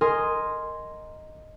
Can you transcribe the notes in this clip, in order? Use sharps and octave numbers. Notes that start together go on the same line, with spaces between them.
A#4 D#5 G#5 C6